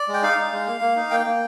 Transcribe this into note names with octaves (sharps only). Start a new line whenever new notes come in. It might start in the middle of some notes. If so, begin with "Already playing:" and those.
Already playing: D5
G#3
G5
D#4 F5
D#4
G#3
A#3
A#3
D#4
A#3 G5
A#3